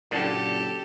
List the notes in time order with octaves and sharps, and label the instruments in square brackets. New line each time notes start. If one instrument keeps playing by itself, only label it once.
[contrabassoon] F#1 [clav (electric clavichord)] A#2 D3 [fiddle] G4 A4